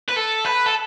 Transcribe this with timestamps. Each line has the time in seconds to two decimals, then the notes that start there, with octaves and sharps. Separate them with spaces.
0.09 B4
0.16 A4
0.45 B4
0.66 A4